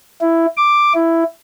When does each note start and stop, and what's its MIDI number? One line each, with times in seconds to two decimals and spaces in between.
0.21 0.46 64
0.57 0.93 86
0.94 1.24 64